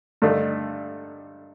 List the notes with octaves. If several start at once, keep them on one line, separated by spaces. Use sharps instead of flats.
G2 D3 A3 D#4